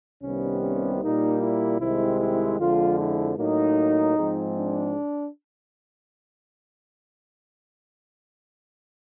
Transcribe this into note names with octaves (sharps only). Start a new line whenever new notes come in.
C2 C3 D#3 G3 B3 C#4
C#4
A#2 G3 A#3 D#4
E4
C2 C3 D#3 G#3 C4 E4
E4
F2 D3 F3 G#3 F4
E4
A2 F#3 A#3 D#4
G#2 F3 G#3 C4
D4